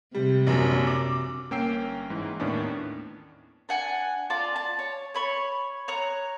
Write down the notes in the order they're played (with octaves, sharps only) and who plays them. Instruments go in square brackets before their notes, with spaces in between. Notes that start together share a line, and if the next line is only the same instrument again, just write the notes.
[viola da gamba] C3 [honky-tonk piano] G3
[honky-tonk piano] A#1 F#2
D6
[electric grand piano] G1 A#3 C#4 G5 E6 C7
G#2 E3
D#2 A2 D#3 B3 C#4 D4
[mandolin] D4 F#5 G#5
F4 D5 A5
A5
C#5
C#5 B5 C#6
C#5 A#5 F#6